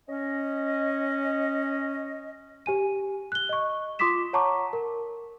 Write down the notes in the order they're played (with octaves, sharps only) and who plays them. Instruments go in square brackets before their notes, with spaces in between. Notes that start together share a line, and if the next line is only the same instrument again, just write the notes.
[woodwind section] C#4 D#5
[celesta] G4 G#5 D#7
F#6 G7
D#5 C#6
F4 C6 D6 D#6 B6 E7
C#5 F#5 A5 A#5 C#6 D6
A#4